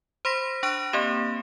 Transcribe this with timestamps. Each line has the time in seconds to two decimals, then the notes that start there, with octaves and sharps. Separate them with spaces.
0.25 C5 B5 C6 A#6 B6
0.63 D4 C#6 F#6 A#6 D7
0.93 A#3 C4 G4 E7